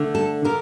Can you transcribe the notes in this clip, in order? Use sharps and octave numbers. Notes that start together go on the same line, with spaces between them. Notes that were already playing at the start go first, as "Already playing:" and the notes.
Already playing: D3 A3
A4
D3 A#4